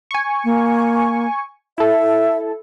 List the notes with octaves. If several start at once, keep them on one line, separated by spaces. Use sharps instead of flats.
G#5 C#6
A#3
E4 A4 E5